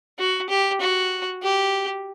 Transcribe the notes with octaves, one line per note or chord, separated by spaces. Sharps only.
F#4
G4
F#4
G4